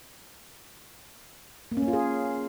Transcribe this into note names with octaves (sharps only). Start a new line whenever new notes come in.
A#3
C#4
A#3
F4
G#4